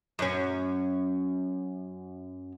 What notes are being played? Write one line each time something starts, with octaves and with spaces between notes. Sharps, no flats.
F#2 C#4